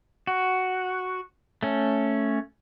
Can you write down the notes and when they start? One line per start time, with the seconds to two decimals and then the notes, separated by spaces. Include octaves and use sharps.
0.27 F#4
1.63 A3 C#4